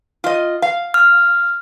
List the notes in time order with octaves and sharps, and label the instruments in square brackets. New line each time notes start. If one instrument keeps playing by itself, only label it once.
[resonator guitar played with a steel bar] F4 D#5
F5
[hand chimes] F6